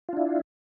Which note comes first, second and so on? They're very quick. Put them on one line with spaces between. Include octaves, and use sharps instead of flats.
F4 D4 E4